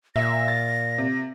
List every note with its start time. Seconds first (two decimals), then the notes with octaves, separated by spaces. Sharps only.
0.16 A#2 E5 A#6
0.48 A6
0.98 C3